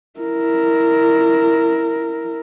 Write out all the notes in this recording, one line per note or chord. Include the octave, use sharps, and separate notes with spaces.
E4 A#4